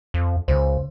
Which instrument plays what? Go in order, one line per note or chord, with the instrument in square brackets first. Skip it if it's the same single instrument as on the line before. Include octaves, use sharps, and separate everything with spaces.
[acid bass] F2
[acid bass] C#2 [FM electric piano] C#3 C5